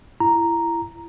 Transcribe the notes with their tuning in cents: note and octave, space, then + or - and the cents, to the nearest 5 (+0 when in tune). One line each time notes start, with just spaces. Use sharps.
E4 +25 A#5 +0